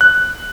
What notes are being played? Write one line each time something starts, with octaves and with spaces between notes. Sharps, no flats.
F#6